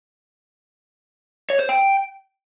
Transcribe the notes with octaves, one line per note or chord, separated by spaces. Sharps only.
C#5
C5
G5